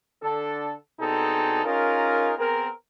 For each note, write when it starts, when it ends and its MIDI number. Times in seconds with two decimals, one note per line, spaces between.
0.22 0.73 50
0.22 0.73 62
0.22 0.73 69
1.00 1.64 47
1.00 1.64 60
1.00 1.64 62
1.00 1.64 63
1.00 1.64 68
1.00 1.64 69
1.65 2.33 61
1.65 2.33 63
1.65 2.33 65
1.65 2.33 68
1.65 2.33 70
2.38 2.68 59
2.38 2.68 60
2.38 2.68 68
2.38 2.68 70